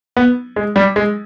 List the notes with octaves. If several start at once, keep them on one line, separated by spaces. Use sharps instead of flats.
B3
G#3
G3
G#3